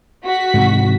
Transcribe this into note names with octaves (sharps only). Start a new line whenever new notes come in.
F#4 B6
G#2 C3 E3